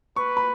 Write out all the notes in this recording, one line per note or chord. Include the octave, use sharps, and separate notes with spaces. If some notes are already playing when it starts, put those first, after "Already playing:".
B4 C#6
B5